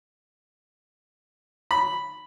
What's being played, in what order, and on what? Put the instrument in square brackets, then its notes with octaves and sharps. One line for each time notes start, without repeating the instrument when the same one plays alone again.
[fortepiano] B5